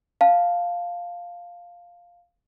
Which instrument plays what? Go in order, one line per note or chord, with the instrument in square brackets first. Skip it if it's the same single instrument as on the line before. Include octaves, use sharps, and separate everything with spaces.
[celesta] F5 A5